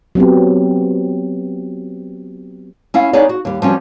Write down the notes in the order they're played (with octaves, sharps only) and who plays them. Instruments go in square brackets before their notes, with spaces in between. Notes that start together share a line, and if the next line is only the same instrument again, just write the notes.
[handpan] F#3 B3 C4 G4
[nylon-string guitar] C#4 E4 F5
B3 D#4 E4 G#4 C#5 D5
F#4
D#2 G3
F3 G3 C#4 F#4